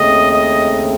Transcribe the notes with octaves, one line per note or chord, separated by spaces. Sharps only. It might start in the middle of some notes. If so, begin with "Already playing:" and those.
Already playing: D#2 C#3 A3 C4 D#5
D#5